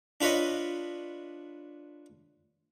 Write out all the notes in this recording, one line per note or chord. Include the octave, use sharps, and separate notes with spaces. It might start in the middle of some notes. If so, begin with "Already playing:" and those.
D4 F4 B4 C#5 D#5